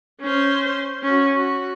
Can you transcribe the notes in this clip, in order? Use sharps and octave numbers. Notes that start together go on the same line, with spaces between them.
C#4 C5
C#4 F#4
F#4